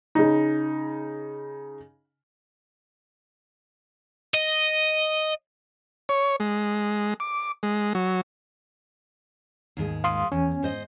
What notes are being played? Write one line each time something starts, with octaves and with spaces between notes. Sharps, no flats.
C#3 D#4
D#5
C#5
G#3
D6
G#3
F#3
D#2 G#2 G#3
F5 C6 D#6
E2 C#4 G#5
G#2 C5 D#5